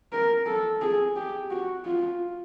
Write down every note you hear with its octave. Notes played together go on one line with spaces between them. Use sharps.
A#4
A4
G#4
G4
F#4
F4